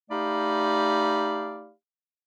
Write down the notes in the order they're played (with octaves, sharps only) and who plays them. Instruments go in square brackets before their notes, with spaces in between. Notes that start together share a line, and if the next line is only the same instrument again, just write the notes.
[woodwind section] A3 D#4 G4 D5 F5 B5